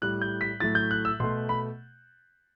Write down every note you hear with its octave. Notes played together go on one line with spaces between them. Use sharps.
A2 G3 F#6
G6
B6
A2 F#3 A3 A6
G6
F#6
E6
B2 A3 C6
B5